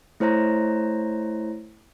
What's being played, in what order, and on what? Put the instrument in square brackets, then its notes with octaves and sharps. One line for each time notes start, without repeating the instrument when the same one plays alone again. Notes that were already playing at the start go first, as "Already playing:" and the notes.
[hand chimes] A3 E4 C5 C#5 A#5 A#6